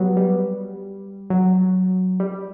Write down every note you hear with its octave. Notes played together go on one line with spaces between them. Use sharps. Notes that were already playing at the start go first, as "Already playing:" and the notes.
Already playing: F#3 G3 B3
G3
F#3
G3